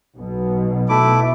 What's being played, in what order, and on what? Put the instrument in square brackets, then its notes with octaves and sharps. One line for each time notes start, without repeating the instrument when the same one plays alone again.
[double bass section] B1 B2
[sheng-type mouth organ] A3 E4 D6